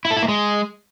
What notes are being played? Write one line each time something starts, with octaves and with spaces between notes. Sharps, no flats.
E4
A4
E4
A#3
G#3